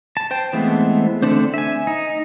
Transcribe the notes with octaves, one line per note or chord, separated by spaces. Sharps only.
A5
C5 G5 A5
E3 G#3 A3 B3 C4
D3 A3 C4 D4 C5
E5 G#5
D#4